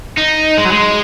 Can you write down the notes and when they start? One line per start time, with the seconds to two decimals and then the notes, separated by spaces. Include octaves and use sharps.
0.17 D#4
0.58 G#3
0.65 F#3
0.72 G#3